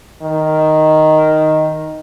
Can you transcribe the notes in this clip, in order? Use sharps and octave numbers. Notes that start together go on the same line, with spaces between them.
D#3